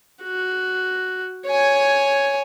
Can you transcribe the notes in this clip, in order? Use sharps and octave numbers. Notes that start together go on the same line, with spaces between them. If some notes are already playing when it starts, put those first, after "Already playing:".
F#4
C#5 G#5